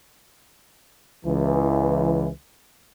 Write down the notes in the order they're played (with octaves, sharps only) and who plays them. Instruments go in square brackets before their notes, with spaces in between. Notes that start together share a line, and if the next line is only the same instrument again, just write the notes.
[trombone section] C#2 E3